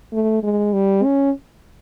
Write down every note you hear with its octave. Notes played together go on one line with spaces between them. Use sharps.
A3
G#3
G3
C#4